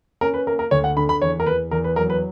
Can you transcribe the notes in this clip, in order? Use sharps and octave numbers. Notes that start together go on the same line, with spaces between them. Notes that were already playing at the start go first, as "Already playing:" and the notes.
C#4 A#4
B4
A#3 A#4
A#4
D2 C#5
F#5
D3 B5
B5
E2 C#5
A#4
E2 B4
E2 A#4
B4
F#3 A#4
B4